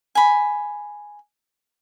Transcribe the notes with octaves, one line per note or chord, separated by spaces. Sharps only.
G#5 B5